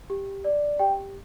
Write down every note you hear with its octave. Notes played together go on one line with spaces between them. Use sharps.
G4
D5
G4 G5